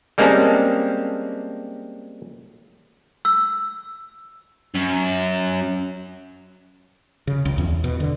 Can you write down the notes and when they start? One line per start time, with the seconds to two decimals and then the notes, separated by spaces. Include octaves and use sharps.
0.18 G3 G#3 A#3 C4 C#4 A5
3.25 E6
4.75 F#2
7.27 C#3
7.45 C#2
7.58 E2
7.84 B2
8.00 D3